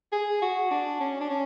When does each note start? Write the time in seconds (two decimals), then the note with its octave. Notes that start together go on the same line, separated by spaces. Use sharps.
0.12 G#4
0.42 F#4
0.71 D4
1.00 C#4
1.21 D4
1.30 C#4